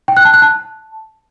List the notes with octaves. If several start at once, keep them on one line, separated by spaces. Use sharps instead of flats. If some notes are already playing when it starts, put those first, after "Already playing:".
G5
F#6
A5
F#6
A5